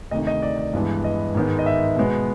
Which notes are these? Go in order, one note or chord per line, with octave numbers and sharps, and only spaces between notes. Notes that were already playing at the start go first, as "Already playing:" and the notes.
D2 C3 D#3 D#5
D#5
D5
D5
G2 E3 G#3 B3
D#5
G#2 D#3 G#3 B3
D#5
E5
B2 G#3 B3